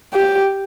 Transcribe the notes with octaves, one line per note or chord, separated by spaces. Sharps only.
G4